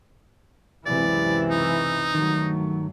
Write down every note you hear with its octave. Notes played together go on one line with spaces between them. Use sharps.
C#2 F#2 C3 E3 E4 D5
D#4
G2 D#3 F#3 A3